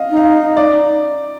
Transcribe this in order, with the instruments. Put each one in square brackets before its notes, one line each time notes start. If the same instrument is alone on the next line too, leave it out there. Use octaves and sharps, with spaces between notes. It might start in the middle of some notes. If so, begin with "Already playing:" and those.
Already playing: [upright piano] D#5 F5
[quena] D#4
[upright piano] F5
D5